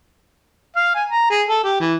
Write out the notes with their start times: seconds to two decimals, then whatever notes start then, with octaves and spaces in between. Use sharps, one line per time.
0.76 F5
0.95 G#5
1.09 A#5
1.30 G#4
1.49 A4
1.64 G4
1.80 E3